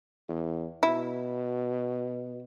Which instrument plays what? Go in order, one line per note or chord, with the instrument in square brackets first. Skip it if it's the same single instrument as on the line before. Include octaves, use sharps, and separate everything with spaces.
[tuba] E2
[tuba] B2 [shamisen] E4